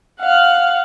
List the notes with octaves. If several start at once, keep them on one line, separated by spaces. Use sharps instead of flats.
F5 F#5